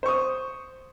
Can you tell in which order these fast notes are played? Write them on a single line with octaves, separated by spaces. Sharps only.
C5 C#6 D#6